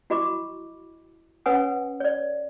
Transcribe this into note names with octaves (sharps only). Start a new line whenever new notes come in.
E4 F#4 D#5 B5 C#6 D6
C#4 B4 C#5 F#5 G#5 D#6
C#5 D5